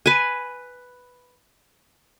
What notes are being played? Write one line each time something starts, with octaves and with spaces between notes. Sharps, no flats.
B4 G#5